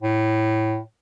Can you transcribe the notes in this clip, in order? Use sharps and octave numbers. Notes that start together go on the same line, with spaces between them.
A2